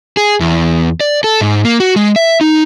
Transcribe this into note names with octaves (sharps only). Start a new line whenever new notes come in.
G#4
E2
D5
A4
G#2
A#3
F#4
G#3
E5
D#4